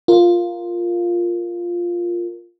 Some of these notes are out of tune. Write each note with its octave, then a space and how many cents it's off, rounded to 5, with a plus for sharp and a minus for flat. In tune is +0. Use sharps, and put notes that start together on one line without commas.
F4 +0 A#4 +0